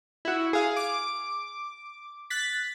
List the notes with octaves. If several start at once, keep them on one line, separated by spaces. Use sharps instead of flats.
E4 F#4
G#4 F5
D6
F#6 A6 B6